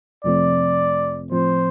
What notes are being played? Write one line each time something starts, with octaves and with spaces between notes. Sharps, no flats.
F2 C3 F3 A3 C4 D5
A2 F3 C4 C5